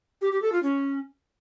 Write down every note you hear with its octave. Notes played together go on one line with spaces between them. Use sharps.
G4
G4
A4
F4
C#4